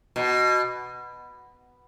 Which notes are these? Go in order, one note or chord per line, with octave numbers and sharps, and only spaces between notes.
B2